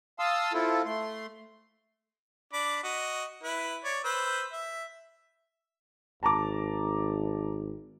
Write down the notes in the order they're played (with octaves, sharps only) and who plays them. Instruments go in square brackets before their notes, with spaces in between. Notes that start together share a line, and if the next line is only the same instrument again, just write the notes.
[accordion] F5 A5 C6 D#6 E6
C4 E4 F4 A4
A3 C6
[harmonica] D4 B5 D6
F#4 D#5
E4 B4
C#5 D5
B4 C5 E6
E5
[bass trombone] G#1 [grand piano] A5 A#5 D6